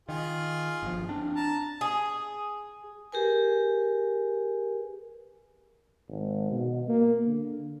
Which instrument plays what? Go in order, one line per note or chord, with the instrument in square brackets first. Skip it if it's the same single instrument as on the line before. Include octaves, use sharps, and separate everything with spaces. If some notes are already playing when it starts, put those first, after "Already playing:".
[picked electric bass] D#3 [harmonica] F4 G#4
[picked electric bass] G1 F3
C4 D4
[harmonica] A5 A#5
[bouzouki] G#4
[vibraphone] G4 G#4 A#4 B4 G#5
[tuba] G#1
B2
A#3
D3